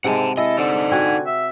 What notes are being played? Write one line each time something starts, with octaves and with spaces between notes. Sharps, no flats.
G#2 C3 G#3 F#5 G#5 A5
E4 G#4 A4 D#5
D3 D#4 C5
C4 F#4 G#5
E5